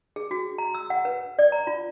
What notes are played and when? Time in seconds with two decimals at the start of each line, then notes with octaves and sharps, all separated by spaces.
0.16 G#4
0.31 F#4
0.58 A#5
0.74 E6
0.90 F#5
1.05 B4
1.39 D5
1.52 A#5
1.67 F4